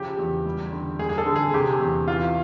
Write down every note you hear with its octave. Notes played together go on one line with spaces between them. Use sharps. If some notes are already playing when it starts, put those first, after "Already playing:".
Already playing: C#3 F3 G4
E2
G3
D3
G3 G#4
G#4
A4
D3
G#4
C3 G4
E2
E3 F4